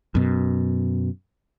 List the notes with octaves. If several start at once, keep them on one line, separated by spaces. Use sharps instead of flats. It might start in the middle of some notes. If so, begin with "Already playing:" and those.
F#2 B2